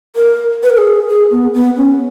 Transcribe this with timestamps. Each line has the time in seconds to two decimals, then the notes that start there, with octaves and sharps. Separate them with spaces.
0.16 A#4
0.63 B4
0.70 A#4
0.78 G#4
1.08 G#4
1.31 B3
1.54 B3
1.77 C#4